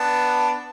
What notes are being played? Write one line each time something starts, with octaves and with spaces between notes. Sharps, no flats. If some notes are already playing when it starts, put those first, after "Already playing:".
Already playing: B3 D4